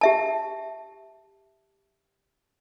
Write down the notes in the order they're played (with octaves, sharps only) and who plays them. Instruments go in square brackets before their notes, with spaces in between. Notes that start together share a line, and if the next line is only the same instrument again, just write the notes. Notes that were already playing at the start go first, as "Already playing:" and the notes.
[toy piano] G4 E5 A5